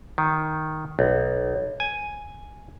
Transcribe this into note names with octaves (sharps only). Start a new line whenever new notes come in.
D#3
B1
G#5